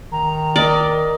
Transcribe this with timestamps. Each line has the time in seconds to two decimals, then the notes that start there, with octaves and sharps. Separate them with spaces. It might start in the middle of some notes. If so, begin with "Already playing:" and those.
0.12 D#3 A#5
0.56 A#4 D5 D#5